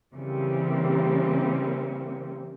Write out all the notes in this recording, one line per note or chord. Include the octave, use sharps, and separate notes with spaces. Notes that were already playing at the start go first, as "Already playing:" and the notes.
C#3 E3 G3 A#3 C4